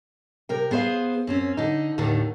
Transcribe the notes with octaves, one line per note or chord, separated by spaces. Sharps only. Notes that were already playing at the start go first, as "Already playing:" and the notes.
C3 A#4 G5
B3 G#4 C5 D5 F5
F#2 C4 C#4
D3 D#4
D#2 A2 D3 D#3